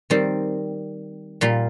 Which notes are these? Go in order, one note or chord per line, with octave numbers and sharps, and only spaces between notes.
D#3 G3 C4
A#2 G3 A#3 F4